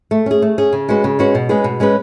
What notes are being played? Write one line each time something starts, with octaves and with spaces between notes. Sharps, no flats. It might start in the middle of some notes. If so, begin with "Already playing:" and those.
A3
C#4 G#4
A3
C#4 G#4
C#3
G#3 C#4 F#4 B4
C#3
G#3 C#4 F#4 B4
B2
G#3 C#4 G#4 B4
B2
G#3 C#4 G#4 B4